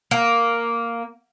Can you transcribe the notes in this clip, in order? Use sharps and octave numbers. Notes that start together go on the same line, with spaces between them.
A#3